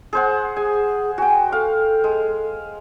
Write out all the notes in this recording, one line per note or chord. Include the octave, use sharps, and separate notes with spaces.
G#4 C5 F#5
G#4 G#5
F#4 G5 G#5
A4 F5
G#3